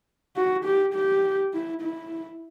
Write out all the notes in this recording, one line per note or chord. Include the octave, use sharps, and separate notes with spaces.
F#4
G4
G4
E4
E4